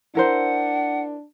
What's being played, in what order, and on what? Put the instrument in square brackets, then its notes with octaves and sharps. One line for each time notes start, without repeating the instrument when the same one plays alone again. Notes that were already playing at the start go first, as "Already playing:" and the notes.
[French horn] D4 [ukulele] E4 A#4 C5 [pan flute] F#5